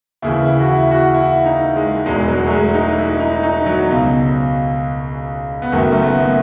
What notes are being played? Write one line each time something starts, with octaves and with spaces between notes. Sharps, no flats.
D#2 C#3 E3 E4
E4
F#4
E4
F#4
E4
D#4
G#3
E1 E2 B2 G#3
F#3
A3
G#3
D#4
E4
D#4
D#4
F#3
C#2 B2
B3
F#1 F#2 D#3 A3
A3
B3